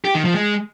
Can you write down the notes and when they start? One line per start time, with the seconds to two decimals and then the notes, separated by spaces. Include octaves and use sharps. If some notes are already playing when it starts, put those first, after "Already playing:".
0.05 G4
0.15 D#3
0.24 F3
0.34 G#3